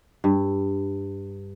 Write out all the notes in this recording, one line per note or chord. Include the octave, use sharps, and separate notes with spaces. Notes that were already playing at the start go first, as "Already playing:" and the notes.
G2